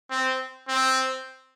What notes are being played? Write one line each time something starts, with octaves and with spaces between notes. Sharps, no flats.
C4
C4